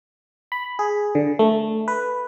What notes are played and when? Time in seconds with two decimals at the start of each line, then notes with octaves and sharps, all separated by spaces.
0.52 B5
0.79 G#4
1.15 D3
1.39 A3
1.88 B4